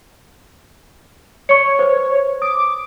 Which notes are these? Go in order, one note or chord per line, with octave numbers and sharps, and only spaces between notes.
C#5 C#6 C#7
B4 C5
D6 D#6